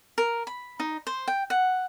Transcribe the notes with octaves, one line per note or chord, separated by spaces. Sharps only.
A#4
B5
D#4
C5
G5
F#5